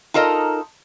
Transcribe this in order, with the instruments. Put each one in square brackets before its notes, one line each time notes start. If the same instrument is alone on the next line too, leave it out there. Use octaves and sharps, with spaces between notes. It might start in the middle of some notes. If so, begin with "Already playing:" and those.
[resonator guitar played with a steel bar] D#4 F4 A4 A#4 D#5